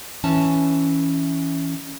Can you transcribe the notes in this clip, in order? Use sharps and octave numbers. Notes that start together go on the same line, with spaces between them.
E3 C#4 A5